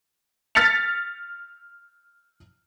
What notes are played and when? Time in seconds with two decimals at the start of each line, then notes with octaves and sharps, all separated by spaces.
0.55 F6 A6 B6 C#7 F7